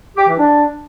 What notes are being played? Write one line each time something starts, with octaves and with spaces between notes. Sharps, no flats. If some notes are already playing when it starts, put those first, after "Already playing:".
G4
E3
D4